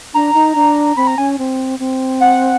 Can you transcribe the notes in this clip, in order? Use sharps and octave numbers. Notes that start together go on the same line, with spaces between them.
D4 A#5
D#4
D4
C4 B5
A#5
C#4 G#5
C4
C4
F#5